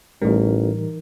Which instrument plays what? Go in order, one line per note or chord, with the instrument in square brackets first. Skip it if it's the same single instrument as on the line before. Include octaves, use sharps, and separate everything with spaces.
[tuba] A1 [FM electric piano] A2 G3 [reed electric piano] E3 D#4 A#4